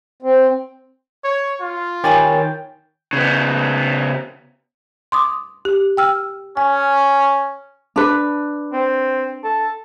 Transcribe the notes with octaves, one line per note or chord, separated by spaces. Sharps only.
C4
C#5
F4
D#3 G4 C#5 G5 G#5 B5 A6
C#3 B3
C6 D6 D#6
G4
G5 E6 F6
C#4 G#5
D4 B4
C4
A4